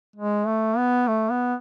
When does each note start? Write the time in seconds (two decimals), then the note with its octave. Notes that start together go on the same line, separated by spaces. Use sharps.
0.16 G#3
0.46 A3
0.77 B3
1.08 A3
1.31 B3